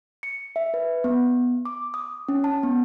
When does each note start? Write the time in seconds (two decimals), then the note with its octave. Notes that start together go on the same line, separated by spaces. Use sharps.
0.23 C#7
0.56 E5
0.74 B4
1.04 B3
1.65 D6
1.94 D#6
2.28 C#4
2.44 A5
2.63 B3